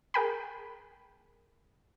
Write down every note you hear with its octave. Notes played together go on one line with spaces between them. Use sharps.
G#4 A#4 G5 B5